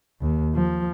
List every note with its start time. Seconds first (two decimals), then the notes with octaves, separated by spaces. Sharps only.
0.21 D#2
0.55 F3